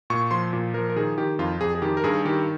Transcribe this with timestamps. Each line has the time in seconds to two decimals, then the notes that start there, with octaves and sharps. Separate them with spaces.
0.10 A#2 C#6
0.31 F3 C6
0.53 A#2
0.74 F3 A#4
0.90 A#4
0.96 D#3 G#4
1.18 D#3 G4
1.39 F2 F4
1.61 F2 G#4
1.75 G#4
1.82 D#3 G4
1.97 A#4
2.04 G2 G#4
2.25 D#3 G4